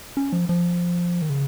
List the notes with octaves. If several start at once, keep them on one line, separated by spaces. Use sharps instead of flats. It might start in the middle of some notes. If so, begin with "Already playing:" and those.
C#4
F3
F3
D#3
C#3